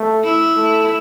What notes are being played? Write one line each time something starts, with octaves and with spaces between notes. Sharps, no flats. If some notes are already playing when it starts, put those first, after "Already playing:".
Already playing: A3
E4
A3